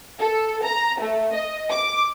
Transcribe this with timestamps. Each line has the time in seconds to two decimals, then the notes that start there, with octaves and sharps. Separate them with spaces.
0.19 A4
0.65 A#5
1.01 A3
1.33 D#5
1.71 D6